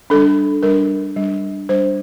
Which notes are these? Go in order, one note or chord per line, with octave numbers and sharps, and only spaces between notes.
G3 D4 A4
G3 D4 A#4
G3 D4
G3 D4 C5